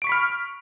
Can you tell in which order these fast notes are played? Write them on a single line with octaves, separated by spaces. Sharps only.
D7 C#6 B6 B5 F6